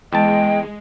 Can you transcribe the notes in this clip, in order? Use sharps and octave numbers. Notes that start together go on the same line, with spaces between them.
E2 G#3 D#5 G5 A5